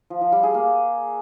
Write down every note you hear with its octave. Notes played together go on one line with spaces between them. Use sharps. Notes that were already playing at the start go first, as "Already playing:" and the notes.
F3
F3
G3
G#4
A#3